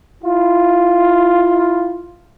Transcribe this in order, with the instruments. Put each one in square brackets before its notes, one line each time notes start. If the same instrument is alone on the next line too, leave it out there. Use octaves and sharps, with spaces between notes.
[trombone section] E4 F4